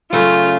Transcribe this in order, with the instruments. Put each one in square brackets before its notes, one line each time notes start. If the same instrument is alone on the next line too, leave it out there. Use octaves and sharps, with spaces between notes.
[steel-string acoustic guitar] C#3 F#3 A3 [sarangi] F4